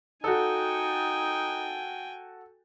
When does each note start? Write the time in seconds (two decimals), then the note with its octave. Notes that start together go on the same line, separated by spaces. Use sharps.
0.24 D#4 F#4 A4 G5 G#5